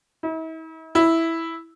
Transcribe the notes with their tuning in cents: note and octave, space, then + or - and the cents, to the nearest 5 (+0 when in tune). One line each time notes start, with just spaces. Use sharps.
E4 -45
E4 -5